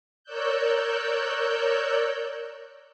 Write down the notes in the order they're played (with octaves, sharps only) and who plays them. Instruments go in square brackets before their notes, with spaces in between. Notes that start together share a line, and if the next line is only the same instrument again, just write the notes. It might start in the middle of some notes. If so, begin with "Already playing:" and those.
[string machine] A#4 C#5 D5 E6 F#6 G6